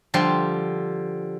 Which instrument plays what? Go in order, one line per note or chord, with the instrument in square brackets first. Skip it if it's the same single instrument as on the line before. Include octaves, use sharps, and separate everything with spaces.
[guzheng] D3 F3 G3 G4 C6